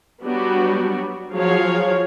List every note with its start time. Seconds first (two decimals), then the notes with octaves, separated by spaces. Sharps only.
0.22 F#3 G3 B3 D4 F#4
1.33 F3 F#3 G#4 C#5 F5